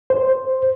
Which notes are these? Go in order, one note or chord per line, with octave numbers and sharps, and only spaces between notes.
C5